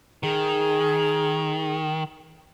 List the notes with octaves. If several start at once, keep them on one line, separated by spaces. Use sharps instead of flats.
D#3 G#4